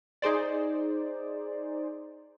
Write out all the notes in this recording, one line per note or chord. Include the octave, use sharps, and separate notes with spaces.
D#4 G#4 C5 D5